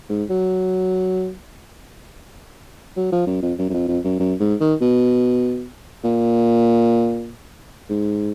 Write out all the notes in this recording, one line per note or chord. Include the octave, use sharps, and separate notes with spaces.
G#2
F#3
F#3
F3
F#2
F2
F#2
F#2
F2
F2
F#2
F#2
G#2
D#3
B2
A#2
G#2